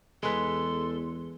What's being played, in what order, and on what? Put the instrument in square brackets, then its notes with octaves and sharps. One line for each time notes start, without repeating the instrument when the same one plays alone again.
[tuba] E2 [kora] G#3 B4 [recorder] A4 [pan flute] C6